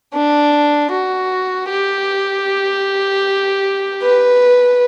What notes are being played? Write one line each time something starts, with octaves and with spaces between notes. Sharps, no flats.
D4
F#4
G4
B4